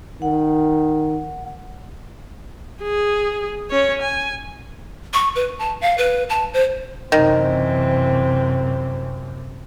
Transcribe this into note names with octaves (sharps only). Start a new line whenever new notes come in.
D#3 F#5
G#4
C#4 C#5
G#5
C#6
B4
A5
F5
B4
A5
C5
F#2 C3 D#3 E3 C4